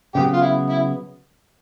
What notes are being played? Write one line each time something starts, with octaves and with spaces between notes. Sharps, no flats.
C#3 F#3 B3 G4
F4
E4
E4